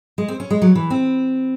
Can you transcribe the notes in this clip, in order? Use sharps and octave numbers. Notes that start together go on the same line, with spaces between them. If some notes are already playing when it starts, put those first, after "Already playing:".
G#3
C4
C#4
G#3
F#3
E3
C4